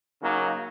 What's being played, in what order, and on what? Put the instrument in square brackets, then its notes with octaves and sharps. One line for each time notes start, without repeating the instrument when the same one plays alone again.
[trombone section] C#3 F#3 A#3 D#4